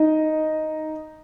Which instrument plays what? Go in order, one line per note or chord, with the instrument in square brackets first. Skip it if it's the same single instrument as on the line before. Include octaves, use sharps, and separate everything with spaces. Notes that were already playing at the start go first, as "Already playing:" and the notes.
Already playing: [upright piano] D#4 D#5